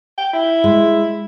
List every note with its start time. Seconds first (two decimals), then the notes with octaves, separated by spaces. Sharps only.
0.18 G5
0.33 E4
0.64 G#3